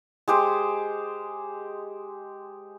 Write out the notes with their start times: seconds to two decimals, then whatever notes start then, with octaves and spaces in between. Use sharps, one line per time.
0.28 G#3 G4 C5